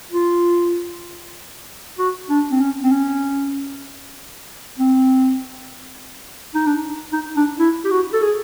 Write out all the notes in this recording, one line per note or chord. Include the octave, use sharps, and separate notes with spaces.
F4
F#4
D4
C4
C#4
C4
C#4
C4
D#4
D4
D#4
D4
E4
G4
F#4
A4
G#4